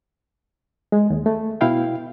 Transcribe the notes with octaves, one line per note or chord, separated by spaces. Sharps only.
G#3
D#2
A3
B2 E4 F5 G5